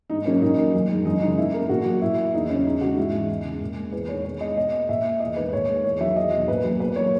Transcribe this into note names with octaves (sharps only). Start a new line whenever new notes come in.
G#2 D#4
F#3 A#3 C#4
A#2 D#4
F#3 A#3
F#2
D#3 G#3
F#2 D#4
C#3 E3 G#3 D#4
B2 E4
A#3 A#4
A#2 F#4
F#3 A#3
A#2 E4
A#3
E2 D#4
C#3 F#3 C#4
E2 D#4
C#3 G#3 F#4
G#2 E4
E3 G#3
E2
C#3 G#3
A#2
G#3
E2 B4
D#3 G#3 C#5
B2 C#5
G#3 D#5
B2 D#5
A#3
A#2 E5
A#3
E2 D#5
D#3 G#3 B4
A#2 C#5
G#3
E2 C#5
D#3 F#3 E5
E2 D#5
B2 F#3
A#2 B4
F#3 A#3
B2 B4
F#3 A#3 C#5